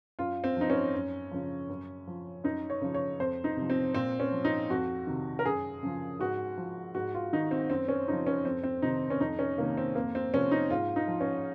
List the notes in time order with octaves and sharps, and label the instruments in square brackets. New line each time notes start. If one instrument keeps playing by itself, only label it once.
[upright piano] F#2 F4
C4
F3 D#4
C#4
F#2
C#3 F3
F#2
F3
F#2 D#4
C#5
C#3 F3
C#5
F2 C5
D#4
C3 F3
C4
A#2 C4
C#4
F3
D#4
F2 F#4
C3 D#3
A#4
F#2 G#4
C#3 F3
G#2 F#4
F3
G#2 F#4
F4
D#3 D#4
C4
F#2 C4
C#4
C#3 F3 D#4
C#4
F2 C4
C4
C3 D#3 D#4
C#4
F2 D#4
C#4
C3 D#3 A#3
C4
F2 A#3
C4
C3 F3 C#4
D#4
G#2 F4
D#4
F3
C#4